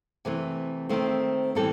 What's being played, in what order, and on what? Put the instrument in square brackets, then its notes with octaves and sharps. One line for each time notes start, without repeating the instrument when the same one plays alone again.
[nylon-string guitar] C3 E3 A3 C4
D#3 A3 C4 C5
A2 E3 G3 C4 A4